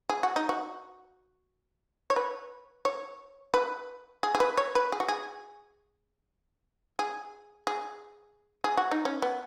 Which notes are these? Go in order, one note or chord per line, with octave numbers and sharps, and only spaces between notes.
G#4
F#4
D#4
F#4
C#5
B4
C#5
B4
G#4
G#4
B4
C#5
B4
G#4
F#4
G#4
G#4
G#4
G#4
F#4
D#4
C#4
B3